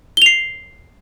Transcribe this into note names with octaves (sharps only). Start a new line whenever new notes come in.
C7 F7 G7